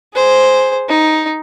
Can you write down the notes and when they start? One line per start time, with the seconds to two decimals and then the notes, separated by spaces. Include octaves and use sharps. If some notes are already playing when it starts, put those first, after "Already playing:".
0.15 G#4 C5
0.89 D#4